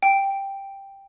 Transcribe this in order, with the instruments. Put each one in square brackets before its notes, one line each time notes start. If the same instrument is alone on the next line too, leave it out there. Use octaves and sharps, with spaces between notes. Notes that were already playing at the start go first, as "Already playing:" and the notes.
[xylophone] G5